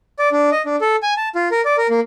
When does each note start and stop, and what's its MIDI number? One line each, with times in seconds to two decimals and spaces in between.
0.19 0.29 74
0.32 0.50 62
0.52 0.62 75
0.66 0.76 62
0.81 0.96 69
1.03 1.14 80
1.17 1.29 81
1.35 1.48 65
1.51 1.61 70
1.65 1.76 74
1.78 1.87 70
1.90 2.00 58